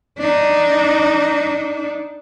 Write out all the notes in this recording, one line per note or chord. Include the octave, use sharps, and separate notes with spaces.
D4 D#4